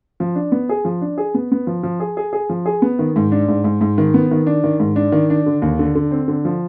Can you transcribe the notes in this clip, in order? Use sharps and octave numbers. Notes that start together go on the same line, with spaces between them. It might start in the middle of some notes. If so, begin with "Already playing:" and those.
F3
D4
B3
G#4
F3
D4
G#4
B3
B3
F3
F3
G#4
G#4
G#4
F3
G#4
B3
D#3
G#2
D4
G#2
G#2
G#2
D#3
B3
D#3
D4
D#3
G#2
D4
D#3
D4
D3
D#2
D3
D3
C4
D3
F3